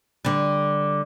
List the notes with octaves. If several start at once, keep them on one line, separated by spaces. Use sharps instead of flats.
D3 G3